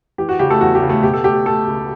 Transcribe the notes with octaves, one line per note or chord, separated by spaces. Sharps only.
E3 G4
F#4
C#3 G4
A3 A4
E2 F#4
G4
C#3
A3 A4
B2 G4
A4
A3 G4
A3 A4
C#2